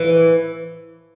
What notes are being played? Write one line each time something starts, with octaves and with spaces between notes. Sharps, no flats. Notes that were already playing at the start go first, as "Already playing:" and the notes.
Already playing: E3